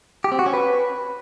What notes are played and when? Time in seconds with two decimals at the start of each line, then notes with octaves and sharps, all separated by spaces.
0.24 G4
0.32 C4
0.39 F#4
0.46 C#4
0.53 B4